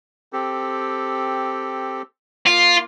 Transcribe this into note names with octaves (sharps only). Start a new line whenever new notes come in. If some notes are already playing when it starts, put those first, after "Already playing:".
C4 G4 A4
A#3 F4